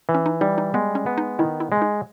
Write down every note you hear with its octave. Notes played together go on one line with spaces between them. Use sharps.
E3
C#4
D#4
G3 D#4
D#4
G#3 B3
C#4
B3
D#4
D#3 E4
E4
G#3
D#4